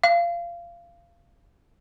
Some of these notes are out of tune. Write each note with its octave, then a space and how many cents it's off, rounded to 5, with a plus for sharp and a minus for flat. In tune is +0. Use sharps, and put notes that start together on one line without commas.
F5 -20